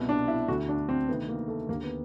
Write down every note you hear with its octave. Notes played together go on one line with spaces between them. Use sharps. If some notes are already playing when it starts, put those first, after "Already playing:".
Already playing: C2 B2
D4
E4
D2 D3 F#4
D4
C4
D2 C3 D#3 B3
A#3
A3
D#2 D3 A#3
B3